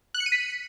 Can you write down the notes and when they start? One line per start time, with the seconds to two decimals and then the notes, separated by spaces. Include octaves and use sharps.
0.14 F#6
0.20 C#7
0.26 D#7
0.32 B6